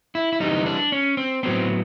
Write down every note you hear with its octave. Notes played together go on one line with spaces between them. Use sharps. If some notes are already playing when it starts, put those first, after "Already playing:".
E4
E4
C3 E3 G3 D#4
D4
C#4
C4
A2 F#3 B3 C4